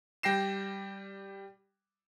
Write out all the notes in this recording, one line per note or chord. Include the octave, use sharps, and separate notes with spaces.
G3 G5 A#6 C7 E7